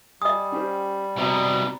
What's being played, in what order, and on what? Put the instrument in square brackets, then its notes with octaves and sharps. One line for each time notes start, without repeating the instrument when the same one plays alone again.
[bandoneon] G3 [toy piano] D#5 D#6 [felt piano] G#5
[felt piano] C#4 G4 C5
[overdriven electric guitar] C2 B2 [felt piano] C4 D5 A#5